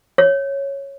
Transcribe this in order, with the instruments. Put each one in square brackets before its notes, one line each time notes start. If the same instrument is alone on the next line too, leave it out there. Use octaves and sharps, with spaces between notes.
[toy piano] C#5